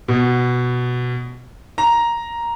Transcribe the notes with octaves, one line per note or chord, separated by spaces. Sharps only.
B2
A#5